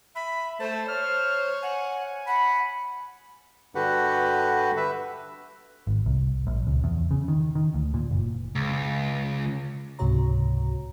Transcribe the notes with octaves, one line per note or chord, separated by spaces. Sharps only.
E5 B5
A3 C5 A5
C#5 F6
F#5 G#5
F#5 B5
G2 D3 F#4 G4 B4 F#5
B4 E5
G#1
C2
A#1
C#2
E2
C#3
D#3
D#3
D2
A#2
F#1
C#2
C#2 G#2 C3 F#4 C#5 A#5